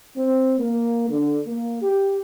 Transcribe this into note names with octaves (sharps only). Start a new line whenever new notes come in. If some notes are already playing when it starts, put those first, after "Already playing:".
C4
A#3
D3
A#3
G4